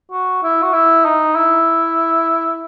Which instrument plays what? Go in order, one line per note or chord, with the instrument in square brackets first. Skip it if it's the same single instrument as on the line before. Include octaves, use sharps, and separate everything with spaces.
[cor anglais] F#4
E4
F#4
E4
D#4
E4